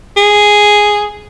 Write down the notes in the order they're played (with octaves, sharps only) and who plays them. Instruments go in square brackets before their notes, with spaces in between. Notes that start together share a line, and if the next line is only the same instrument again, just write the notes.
[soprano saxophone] G#4